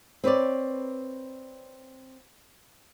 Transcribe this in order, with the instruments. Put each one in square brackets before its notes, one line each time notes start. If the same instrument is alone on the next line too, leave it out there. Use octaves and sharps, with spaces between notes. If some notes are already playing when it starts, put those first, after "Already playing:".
[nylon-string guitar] C4 B4 C#5 D5